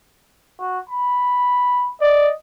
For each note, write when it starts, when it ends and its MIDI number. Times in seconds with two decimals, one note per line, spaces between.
0.60 0.79 66
0.90 1.91 83
2.01 2.28 74
2.01 2.33 75